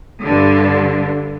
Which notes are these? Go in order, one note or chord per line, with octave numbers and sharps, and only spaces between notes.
G2 D3